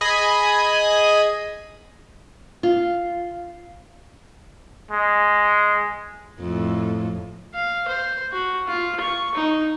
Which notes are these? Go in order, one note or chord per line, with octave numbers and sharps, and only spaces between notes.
G#4 D#5 G#5 B5 D#6 G#6
F4
G#3
F2 A2
F5
C5
F#4
F4
C#6
D#4